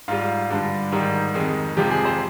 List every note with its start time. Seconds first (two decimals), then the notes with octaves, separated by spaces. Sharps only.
0.08 G#2 G3 F4
0.50 G2 D3 G3
0.92 G#2 D#3 G3
1.34 F2 D#3 G#3
1.77 F2 C3 F3 G#3 G4
1.91 G#4
2.05 C5